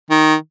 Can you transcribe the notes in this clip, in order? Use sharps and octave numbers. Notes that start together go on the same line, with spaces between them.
D#3